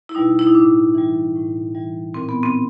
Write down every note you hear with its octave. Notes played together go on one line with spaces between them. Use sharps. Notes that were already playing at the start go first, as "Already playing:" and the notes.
E4
B2 G3 D#4
E4
D#4
A2 D4
E3 G3
A2
E3 G3
A#2 C4
B3
C4